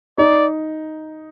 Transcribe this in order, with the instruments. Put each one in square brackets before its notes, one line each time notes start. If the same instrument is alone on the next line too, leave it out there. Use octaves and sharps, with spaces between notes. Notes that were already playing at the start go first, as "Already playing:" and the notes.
[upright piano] D#4 [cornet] D5